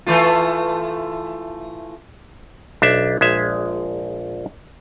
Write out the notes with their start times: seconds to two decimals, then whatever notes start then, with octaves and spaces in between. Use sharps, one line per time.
0.06 E3 A3 F4
2.82 B1 D4 E5
3.21 A#1 G#3 E5